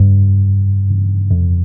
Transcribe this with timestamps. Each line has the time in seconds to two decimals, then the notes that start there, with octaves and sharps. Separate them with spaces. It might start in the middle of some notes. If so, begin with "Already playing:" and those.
Already playing: G2
1.31 F2